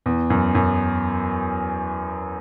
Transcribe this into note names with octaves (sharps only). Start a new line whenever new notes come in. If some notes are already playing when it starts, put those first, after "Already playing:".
E2
F#2
F#2